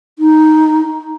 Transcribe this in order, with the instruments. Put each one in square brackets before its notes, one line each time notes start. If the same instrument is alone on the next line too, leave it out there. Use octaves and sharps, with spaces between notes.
[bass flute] D#4